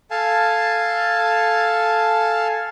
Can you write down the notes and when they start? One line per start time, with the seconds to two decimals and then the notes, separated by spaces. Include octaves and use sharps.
0.11 A4 F5 G#5 A5